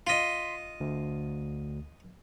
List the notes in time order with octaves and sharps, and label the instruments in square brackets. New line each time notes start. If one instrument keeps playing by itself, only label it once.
[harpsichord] F4 D#5 [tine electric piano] C6 B6
[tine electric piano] D2